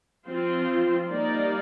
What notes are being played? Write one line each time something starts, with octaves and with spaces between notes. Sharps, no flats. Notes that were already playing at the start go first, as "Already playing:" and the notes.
F3 C4 F4 C5
G3 A#3 D#4 A#4 D5